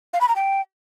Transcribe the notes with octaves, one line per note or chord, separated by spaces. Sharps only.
F5
B5
A#5
G5